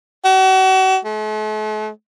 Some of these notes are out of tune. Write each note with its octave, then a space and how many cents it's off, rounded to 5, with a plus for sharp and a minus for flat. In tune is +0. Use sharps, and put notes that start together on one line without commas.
F#4 +40
A3 -45